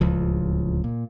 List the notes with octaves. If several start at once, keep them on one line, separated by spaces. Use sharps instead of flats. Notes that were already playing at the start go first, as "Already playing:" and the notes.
D1 C#2 F3
A#2